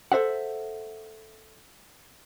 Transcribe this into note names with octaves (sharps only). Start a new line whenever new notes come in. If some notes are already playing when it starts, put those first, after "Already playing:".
A4 C5 E5 F#5